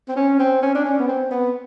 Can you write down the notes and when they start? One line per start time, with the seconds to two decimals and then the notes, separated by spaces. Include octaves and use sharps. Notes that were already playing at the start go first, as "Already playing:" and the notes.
0.08 C4
0.16 C#4
0.39 C4
0.62 C#4
0.75 D4
0.85 C#4
0.99 B3
1.08 C4
1.31 B3